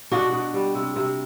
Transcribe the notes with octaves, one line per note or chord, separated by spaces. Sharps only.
B2 D4 F#4
B2
G3
C3
C3